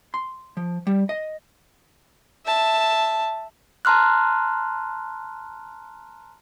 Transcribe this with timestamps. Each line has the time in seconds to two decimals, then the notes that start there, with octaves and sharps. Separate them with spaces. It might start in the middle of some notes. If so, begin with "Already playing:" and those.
0.14 C6
0.57 F3
0.87 G3
1.09 D#5
2.46 E5 A5
3.85 A5 A#5 C6 F6 F#6